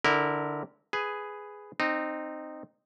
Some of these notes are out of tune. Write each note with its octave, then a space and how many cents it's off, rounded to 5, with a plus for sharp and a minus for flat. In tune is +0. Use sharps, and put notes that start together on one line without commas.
D3 +5 E4 -20 A#4 +0
G#4 +0 B4 +10
C4 +0 D#4 -15